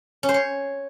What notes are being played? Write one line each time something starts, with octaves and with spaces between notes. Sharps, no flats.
C#4
C5
C#5